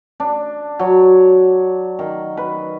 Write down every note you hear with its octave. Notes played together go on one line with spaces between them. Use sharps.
D4
F#3
D#3
B4